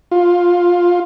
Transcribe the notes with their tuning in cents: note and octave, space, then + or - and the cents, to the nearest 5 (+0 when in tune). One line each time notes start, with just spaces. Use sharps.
F4 +10